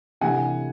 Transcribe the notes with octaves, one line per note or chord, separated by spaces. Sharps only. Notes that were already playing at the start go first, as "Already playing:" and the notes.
C2 C3 E3 A3 D4 F#5 G#5